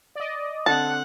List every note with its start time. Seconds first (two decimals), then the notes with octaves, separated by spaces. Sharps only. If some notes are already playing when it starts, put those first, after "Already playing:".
0.15 D5 D#5
0.66 D3 C4 F#5 A5